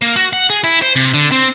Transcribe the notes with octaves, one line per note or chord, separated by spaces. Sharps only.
A#3
F#4
F#5
G#4
E4
C5
C3
D3
C4